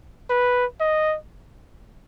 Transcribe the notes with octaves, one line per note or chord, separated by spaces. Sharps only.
B4
D#5